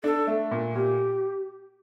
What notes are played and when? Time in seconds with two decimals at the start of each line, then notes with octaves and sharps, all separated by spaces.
0.04 D4 A4
0.27 A3
0.51 A#2
0.75 A#2 G4